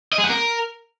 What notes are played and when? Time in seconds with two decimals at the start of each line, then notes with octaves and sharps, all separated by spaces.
0.12 D#5
0.18 G#4
0.24 F#5
0.30 A#4